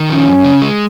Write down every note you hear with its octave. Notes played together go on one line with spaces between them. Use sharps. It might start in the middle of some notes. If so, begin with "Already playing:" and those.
Already playing: D#3
F3 C#4
F#2
C#3
G#3